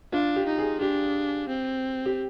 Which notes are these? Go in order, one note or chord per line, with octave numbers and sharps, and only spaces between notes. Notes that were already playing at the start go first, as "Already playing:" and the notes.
D4 F4
G4
D#4
G#4
D4 G4
C4
G4